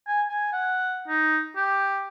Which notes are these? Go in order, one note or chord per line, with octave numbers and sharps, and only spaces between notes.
G#5
G#5
F#5
D#4
G4